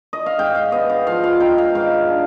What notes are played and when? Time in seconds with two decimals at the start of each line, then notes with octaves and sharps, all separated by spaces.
0.13 D#5
0.26 F5
0.38 G#2 G5
0.55 F5
0.72 B3 D#5
0.90 F5
1.07 F3 F5
1.24 F5
1.40 D#4 G5
1.58 F5
1.75 G#2 F5
2.09 D4